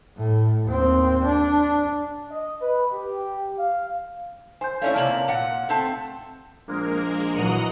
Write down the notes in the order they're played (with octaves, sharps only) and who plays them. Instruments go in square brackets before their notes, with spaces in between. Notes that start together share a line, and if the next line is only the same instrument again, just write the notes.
[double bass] A2
D#2 C4
D4
[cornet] D#5
B4
G4
F5
[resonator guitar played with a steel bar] C5 [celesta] G#5 G6
[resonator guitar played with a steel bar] A3 C#4 E4 [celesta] C#5 D5 F5
[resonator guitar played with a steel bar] C3 A#3 A5 [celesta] F5 F#7
[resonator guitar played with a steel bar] A#2 F#5
A3 C4 A5
[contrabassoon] A#1 [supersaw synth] G#3 A#3 A#4
[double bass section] A#2 E3 F#3 [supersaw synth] D#5 F#5 A#5